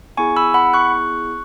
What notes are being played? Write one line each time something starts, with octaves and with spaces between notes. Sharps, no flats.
B3 E4 G#4 G#5 C#6
B5 E6
F#5 B5
C#6 F#6